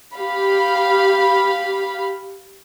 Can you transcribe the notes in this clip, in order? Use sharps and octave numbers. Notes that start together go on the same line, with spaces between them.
G4 F5 B5